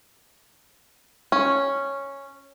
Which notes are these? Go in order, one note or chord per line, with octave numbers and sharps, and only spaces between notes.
C#4